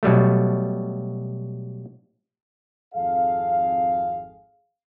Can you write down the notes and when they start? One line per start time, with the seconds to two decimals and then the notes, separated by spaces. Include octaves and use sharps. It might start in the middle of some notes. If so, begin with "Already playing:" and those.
0.03 B2 F#3 G3 A3
2.94 G#1 F2 G#4 A4 F5